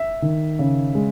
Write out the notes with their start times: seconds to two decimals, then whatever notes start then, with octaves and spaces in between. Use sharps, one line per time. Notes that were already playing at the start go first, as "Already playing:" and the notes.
Already playing: E5
0.22 D#3
0.59 C#3
0.95 G#3